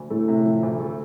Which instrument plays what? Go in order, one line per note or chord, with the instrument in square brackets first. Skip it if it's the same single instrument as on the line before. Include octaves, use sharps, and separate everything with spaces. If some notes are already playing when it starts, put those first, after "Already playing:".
Already playing: [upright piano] D2
[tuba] A2 [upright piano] A3
[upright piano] C3
F3
D2
A3